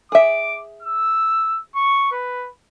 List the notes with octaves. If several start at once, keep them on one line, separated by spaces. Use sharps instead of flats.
G#4 E5 D6
E6
C#6
B4